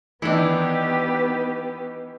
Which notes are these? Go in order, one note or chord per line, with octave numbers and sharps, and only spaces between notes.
D#3 E3 B3 D4 E4 G4 B4